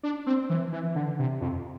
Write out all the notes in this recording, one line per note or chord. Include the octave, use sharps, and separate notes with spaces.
D4
C4
E3
E3
D3
C3
F2